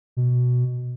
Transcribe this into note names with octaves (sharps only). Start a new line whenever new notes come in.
B2